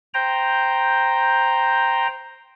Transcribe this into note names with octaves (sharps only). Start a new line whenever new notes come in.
C5 G5 A#5